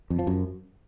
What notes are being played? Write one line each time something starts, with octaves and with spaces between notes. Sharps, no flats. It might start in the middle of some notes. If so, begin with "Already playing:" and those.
F2
F3
F#2